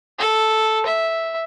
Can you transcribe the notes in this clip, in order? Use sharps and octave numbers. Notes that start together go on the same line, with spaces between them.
A4
E5